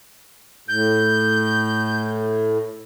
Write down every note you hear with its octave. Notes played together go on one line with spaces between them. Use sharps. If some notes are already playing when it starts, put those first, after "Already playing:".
A2 G6